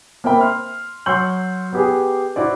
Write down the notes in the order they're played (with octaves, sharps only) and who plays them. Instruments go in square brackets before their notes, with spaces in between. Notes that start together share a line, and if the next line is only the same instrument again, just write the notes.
[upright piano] A#3 C4 A#4 E5 G5 B5
C6 F6
F#3 C6 C#6 E6 G6 F#7
B3 G4 G#4
E4 F#4 C5 D5